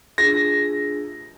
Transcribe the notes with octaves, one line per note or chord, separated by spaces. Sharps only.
D4 F4 G#4 A#6